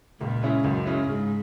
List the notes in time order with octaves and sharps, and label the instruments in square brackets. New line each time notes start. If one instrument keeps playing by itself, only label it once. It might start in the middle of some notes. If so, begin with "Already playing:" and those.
[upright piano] C#2 [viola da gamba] A#2
[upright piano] C#3 G#3 C#4 E4
[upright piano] C#2 [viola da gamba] F#2
[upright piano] C#3 G#3 C#4 E4
[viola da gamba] G#2 [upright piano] C#3